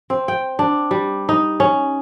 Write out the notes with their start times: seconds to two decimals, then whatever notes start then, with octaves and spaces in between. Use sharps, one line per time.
0.10 C4
0.28 G5
0.59 D4
0.91 G3
1.29 D#4
1.60 C#4